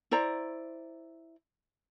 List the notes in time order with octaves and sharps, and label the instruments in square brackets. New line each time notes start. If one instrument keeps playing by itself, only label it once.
[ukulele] E4 C5 D5 A#5